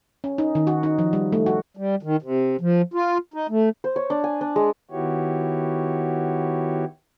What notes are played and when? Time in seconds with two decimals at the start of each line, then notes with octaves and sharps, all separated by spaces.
0.24 C#4
0.38 D#4
0.55 D#3
0.67 F#4
0.83 D#4
0.99 F3
1.13 G3
1.32 A3
1.46 F#4
1.77 G3
2.03 D#3
2.22 C3
2.61 F3
2.94 F4
3.34 D#4
3.49 A3
3.84 C5
3.96 C#5
4.10 D4
4.24 G#5
4.41 D4
4.56 G#3
4.91 D#3 B3 E4 F#4 G4 C#5